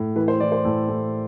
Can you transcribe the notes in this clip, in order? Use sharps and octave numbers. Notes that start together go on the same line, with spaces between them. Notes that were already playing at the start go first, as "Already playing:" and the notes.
Already playing: A2
E3 B4
C5
E3 D5
C5
A2 A4
A2